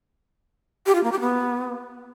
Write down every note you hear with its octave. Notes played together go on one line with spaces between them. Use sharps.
G4
F4
A#3
G4
B3